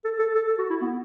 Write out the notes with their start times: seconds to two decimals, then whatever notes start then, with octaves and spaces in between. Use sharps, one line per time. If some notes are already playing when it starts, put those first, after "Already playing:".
0.04 A4
0.19 A4
0.35 A4
0.47 A4
0.59 F#4
0.70 E4
0.82 B3